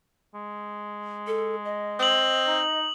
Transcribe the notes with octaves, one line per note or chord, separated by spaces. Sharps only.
G#3
A4
D#5
C4 D#6 F#7
D#4